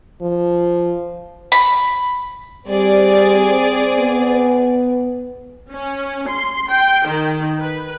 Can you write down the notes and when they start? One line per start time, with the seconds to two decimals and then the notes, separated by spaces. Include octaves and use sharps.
0.22 F3
1.52 B5
2.68 G3 C4 G#4 D5
3.99 B3
5.71 C#4
6.29 C6
6.70 G5
7.07 D#3
7.61 B4